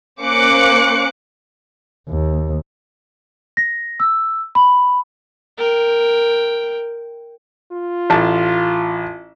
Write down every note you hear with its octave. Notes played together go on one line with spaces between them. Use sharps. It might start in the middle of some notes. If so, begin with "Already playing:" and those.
A#3 C#4 C5 D6 F#6 C#7
D#2
A#6
E6
B5
A#4 G5
F4
A1 A5